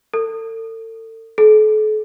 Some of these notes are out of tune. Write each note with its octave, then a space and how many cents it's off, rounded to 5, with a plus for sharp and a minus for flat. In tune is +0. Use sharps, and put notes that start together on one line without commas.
A4 +35
A4 -40